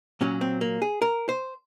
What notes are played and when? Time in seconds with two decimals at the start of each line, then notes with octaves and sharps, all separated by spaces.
0.21 A#2 F#3 C#4
0.41 C4
0.61 A#3
0.82 G#4
1.02 A#4
1.29 C5